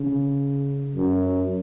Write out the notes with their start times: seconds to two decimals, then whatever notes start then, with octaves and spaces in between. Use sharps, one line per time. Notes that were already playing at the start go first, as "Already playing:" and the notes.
Already playing: C#3
0.95 F#2